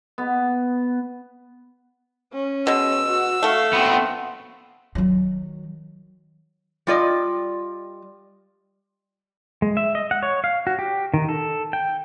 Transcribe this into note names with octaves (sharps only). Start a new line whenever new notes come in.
B3
C#4
B2 G#3 E6
F#4
A3 F#4 F5
B3 C4 F#5
D#3 F#3
G3 F4 D5 D#5
G#3
E5
D#5
F#5
C#5
F5
F#4
G4
D#3
A4
G5